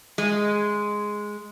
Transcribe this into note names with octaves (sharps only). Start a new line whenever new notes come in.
G#3